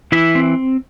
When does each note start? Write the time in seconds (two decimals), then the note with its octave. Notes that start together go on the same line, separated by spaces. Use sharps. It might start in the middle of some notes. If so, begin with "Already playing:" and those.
0.12 E3 E4 E5
0.35 C4